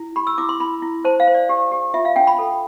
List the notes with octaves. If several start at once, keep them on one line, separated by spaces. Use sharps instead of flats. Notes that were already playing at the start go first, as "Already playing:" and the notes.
Already playing: E4
G4 B5
E6
E4 D6
C6
E4 B5
E4
C5 A5
F5
C5
D5
G4
G4
F4 E5
F5
D4 G5
B5
A4